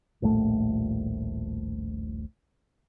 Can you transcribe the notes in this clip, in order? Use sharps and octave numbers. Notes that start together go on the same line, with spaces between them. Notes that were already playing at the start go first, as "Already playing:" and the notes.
D#1 A#1 A2 A3